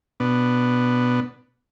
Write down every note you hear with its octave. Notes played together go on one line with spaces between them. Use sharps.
B2 B3 D4